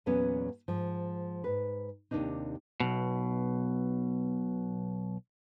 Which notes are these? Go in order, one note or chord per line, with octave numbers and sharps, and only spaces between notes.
E2 A#2 F#3 B3 C#4
G#2 F3
G#2 B4
D#2 A2 C3 D4 D#4
B1 B2